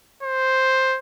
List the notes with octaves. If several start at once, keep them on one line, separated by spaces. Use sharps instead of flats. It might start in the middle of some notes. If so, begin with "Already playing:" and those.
C5